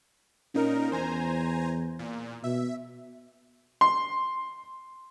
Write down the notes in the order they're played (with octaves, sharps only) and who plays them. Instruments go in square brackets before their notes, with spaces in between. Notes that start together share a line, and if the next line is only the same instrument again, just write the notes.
[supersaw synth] A#2 D#4 A#4 [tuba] C#4
[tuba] E2 [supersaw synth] C5 G#5 A#5
[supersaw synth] A#2
[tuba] B2 [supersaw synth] E5
[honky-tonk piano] C6